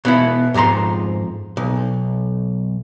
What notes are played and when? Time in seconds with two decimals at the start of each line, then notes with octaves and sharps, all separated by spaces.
0.05 B2 B3 E4
0.54 F2 G#2 F3 A#5 C6
1.57 B1